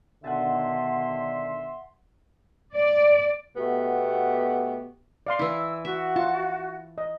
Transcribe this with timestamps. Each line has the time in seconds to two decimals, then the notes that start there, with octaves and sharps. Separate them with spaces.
0.24 B2 D3 D#3 E5 F#5 G#5 A5 C6
2.76 D5
3.56 B2 A3 B3 F#4 G4
5.27 D5 F5 C6
5.39 E3 E4 E6
5.85 F#4 E5
6.16 F4 A5
6.98 D#5